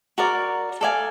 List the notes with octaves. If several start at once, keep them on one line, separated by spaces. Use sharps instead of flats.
F#4 A#4 D5
A4 D5 F5 G#5